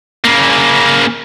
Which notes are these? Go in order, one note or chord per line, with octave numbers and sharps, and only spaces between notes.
C#3 A#3